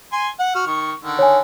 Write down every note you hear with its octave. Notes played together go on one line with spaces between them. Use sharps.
G#5 C6
F#5
F#4 F6
D#3 C#6
D3 D#3
C#5 G#5